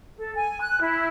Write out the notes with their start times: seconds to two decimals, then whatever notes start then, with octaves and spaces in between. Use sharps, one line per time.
0.18 A4
0.35 G#5
0.61 F#6
0.80 E4